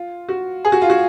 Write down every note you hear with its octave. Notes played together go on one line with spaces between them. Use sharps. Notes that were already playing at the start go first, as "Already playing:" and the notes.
Already playing: F4
F#4
G#4
F#4
F4
F#4